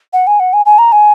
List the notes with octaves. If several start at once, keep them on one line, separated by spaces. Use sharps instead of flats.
F#5
G#5
F#5
G#5
G#5
A#5
G#5